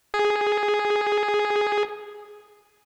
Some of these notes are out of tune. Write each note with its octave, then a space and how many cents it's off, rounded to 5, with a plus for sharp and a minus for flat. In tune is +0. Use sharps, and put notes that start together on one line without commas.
G#4 +0